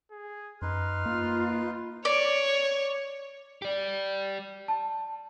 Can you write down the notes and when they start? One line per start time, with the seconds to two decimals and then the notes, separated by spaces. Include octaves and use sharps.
0.11 G#4
0.62 F#2 D#4 B4 C6 F6
1.06 A#3 F4
2.05 C#5 D5
3.62 G4 D5
4.68 A5